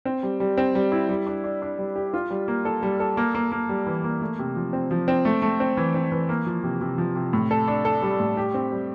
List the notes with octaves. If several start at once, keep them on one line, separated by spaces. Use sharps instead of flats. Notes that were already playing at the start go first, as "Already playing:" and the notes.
C4
G3
G3
C4
G3
E4
G3
D4
D4
D4
G3
G4
F4
G3
A#3
A4
G3
A4
A#3
A#3
A#3
G3
E3
A#3
A3
C3
F3
C4
F3
C4
A3
A3
C4
E3
C4
E3
A#3
F3
C3
C3
F3
C3
A2
A4
D4
A4
G3
A2
G4
C4
G3